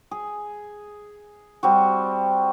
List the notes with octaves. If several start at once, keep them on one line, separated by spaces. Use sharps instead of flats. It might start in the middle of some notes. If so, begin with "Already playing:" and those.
G#4
G3 C4 F#4